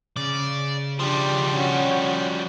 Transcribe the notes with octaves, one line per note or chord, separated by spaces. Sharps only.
C#3 D5
F3 G3 D4 G4
C#4 F#4